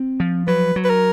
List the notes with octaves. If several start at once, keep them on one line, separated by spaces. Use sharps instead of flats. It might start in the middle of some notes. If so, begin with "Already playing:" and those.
Already playing: C4
F3
F#3 B4
F#3
B4
A#4